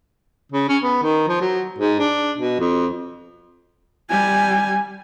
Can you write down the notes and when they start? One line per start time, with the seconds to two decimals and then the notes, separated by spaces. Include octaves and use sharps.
0.52 C#3
0.69 C#4
0.83 B3
1.03 D#3
1.28 F3
1.41 F#3
1.78 G#2
1.99 D4
2.38 B2
2.59 F2
4.10 G3 G#5